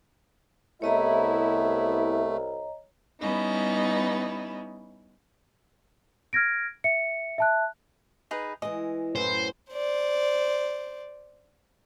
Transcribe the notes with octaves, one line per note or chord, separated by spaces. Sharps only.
C2 C3 A3 B3 E4 C#5 D#5 A#5
G3 B3 C#4 D#4 E4
F6 G#6 A#6 D7
E5 C#7
E5 A5 F#6
D#4 G#4 B4
E3 G#3 D#5
F#2 A2 B4 C5
C5 D5